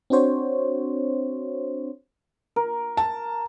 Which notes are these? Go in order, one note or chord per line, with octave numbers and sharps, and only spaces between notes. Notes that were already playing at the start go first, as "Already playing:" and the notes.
C4 D4 F#4 C5 C#5
A#4
A5